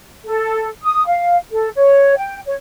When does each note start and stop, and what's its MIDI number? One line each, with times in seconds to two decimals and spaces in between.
0.25 0.68 69
0.83 1.06 87
1.06 1.36 77
1.52 1.69 69
1.76 2.15 73
2.17 2.38 79
2.46 2.54 73